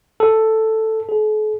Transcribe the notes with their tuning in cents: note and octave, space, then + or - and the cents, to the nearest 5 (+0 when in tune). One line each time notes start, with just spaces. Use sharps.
A4 +5
A4 -45